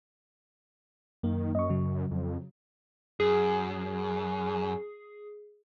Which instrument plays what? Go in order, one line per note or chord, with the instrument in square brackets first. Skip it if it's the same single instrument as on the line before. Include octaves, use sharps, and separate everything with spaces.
[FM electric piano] F#2 A#3 [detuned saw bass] D#3
[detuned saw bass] F#2 [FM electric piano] D#5 C#6
[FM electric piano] C#3 F#3
[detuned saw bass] F2
[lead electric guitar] F#2 [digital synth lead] G#4